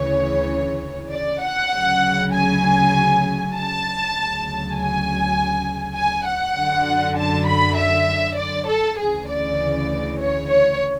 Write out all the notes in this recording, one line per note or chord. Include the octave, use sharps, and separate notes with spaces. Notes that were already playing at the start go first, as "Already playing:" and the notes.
Already playing: D2 C#3 E3 C#5
D5
F#5
D2 C#3 F#3
G#5
A5
D2 C#3 F#3
G#5
G#5
F#5
F#2 D3 F#3
A5
B5
E5
D5
A4
D2 C#3 E3 G#4
D5
C#5
C#5